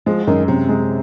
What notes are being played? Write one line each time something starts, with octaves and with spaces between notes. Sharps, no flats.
F3 G#3
F#2 D#3
F#2 C3
G#3